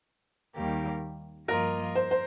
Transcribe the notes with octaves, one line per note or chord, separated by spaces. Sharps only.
D#2 D#3 G3 A#3 G4
G2 F3 A#3 F4 A#4 D#5
C5
C5